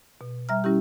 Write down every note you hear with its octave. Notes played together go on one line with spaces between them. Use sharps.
B2
G3 E5 A#5 F6
G3 C#4 E4 G4